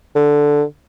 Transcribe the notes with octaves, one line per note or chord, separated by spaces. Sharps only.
D3